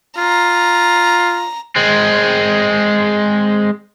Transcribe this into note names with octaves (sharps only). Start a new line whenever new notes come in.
F4 A#5
G#3 C4